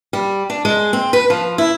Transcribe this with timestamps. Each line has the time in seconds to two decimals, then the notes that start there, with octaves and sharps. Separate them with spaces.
0.13 G3
0.50 D4
0.65 G#3
0.93 C4
1.13 B4
1.30 F3
1.58 E4